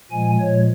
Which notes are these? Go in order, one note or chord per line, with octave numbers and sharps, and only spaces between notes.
A#2 F3 G#3 G#5
A#2 F3 G#3 C#5